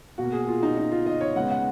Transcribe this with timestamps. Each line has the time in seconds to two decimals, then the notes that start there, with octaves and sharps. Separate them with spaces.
0.18 B2 A#3 F#4
0.32 G#4
0.48 F4
0.63 D#4
0.77 D#4
0.91 F4
1.06 D#5
1.21 C#5
1.36 C#3 G#3 B3 F#5
1.51 F#5